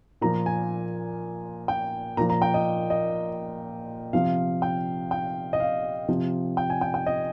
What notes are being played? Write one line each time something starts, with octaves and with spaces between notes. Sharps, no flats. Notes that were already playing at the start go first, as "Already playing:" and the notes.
A#2 F3 A#5
G#5
G5
A#2 F3 A#5
A#5
G5
D#5
D#5
C3 F3 F5
G5
G5
D#5
F5
C3 F3
G5
G#5
G5
G5
D#5